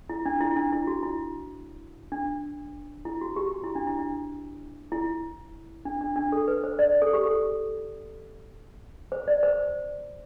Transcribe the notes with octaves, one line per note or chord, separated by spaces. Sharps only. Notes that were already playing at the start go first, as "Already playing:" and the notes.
E4
D4
E4
D4
E4
F#4
E4
D4
E4
F#4
G4
F#4
E4
D4
E4
D4
E4
D4
D4
D4
A4
B4
C5
D5
A4
G4
A4
C5
D5
C5